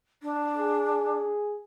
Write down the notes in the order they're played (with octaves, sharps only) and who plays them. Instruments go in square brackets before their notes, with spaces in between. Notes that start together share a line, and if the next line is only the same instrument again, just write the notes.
[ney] D4
[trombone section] G#4